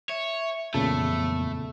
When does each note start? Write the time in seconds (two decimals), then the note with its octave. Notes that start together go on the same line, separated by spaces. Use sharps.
0.09 C#5 E5
0.74 F2 A#2 C#3 E3 F#3 A3 B3 A5